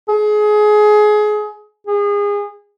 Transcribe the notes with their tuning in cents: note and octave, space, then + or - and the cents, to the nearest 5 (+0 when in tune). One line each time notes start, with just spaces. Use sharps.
G#4 +25
G#4 -30